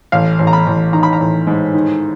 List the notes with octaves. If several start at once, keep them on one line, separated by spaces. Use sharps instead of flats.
A1 F5
A1
A#5
B5
A1
D#3 A#5
B5
A#5
A1
G#2
D#3